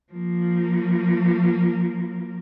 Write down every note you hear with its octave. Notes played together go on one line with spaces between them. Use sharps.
F3 A#3